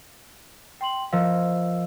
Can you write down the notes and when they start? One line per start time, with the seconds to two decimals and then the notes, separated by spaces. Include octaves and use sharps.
0.81 G5 C6 F#7
1.13 F3 A#4 D#5 F5 E6